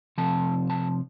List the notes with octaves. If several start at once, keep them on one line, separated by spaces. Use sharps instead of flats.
C3 F3 C4 A5
A5